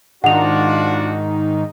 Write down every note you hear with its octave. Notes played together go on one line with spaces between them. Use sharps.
G#2 D#3 D4 D#4 F4 F#4 F#5 F7